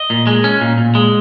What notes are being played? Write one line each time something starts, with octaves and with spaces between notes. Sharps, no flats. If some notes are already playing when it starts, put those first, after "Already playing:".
Already playing: D#5
A#2
G#3
C#4
A#2
A#2
G#3